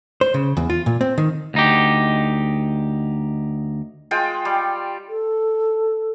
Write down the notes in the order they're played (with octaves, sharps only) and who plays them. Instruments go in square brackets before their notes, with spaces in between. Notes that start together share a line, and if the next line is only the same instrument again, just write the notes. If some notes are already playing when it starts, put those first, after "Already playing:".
[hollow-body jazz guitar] C5
C#3
E2
F4
A#2
C4
D#3
[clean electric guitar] D2 D#4 G4
[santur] G#3 F4 G5
G3
[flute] A4